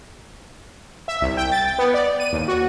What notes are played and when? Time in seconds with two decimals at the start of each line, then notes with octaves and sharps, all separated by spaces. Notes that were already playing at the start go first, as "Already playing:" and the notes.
1.08 E5
1.22 C2
1.37 G5
1.52 A6
1.66 G5
1.79 B3
1.94 D5
2.20 D#7
2.33 D#2
2.48 F#4